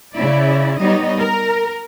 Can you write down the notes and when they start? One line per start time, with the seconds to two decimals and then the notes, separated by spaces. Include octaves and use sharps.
0.15 C#3 E4 D5
0.79 G3 B3 D#4 C#5 D#5
1.18 A#4